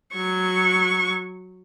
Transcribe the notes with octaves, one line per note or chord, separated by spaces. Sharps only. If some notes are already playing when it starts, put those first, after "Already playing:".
F#3 C#6